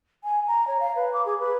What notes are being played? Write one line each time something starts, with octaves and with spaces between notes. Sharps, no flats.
G#5
A#5
C#5
F5
B4
D6
G#4
B4